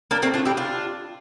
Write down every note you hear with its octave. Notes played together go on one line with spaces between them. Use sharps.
A#3 D4
A3 C4
D4 F4
E4 G4
D4 F4